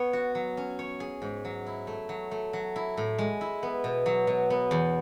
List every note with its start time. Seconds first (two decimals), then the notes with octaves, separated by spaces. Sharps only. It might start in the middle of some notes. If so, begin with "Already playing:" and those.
Already playing: B3 C#5
0.13 F#4
0.35 F#3
0.57 C#4
0.79 C#5
1.00 G#4
1.22 G#2
1.45 F#3
1.67 E4
1.87 A3
2.09 F#3
2.31 A3
2.53 F#3
2.76 E4
2.97 A2
3.19 G#3
3.41 E4
3.63 B3
3.84 B2
4.06 F#3
4.27 B2
4.50 B3
4.71 E2